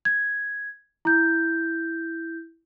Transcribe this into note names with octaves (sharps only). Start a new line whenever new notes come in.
G#6
E4 G6